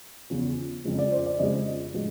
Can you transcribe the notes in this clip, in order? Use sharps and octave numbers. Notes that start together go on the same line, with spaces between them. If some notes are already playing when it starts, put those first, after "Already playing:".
E2 C#3 F3
F2 C#3 F3 G#3
D5
C5
D5
F2 C#3 F3 G#3 D#5
A2 F3 G#3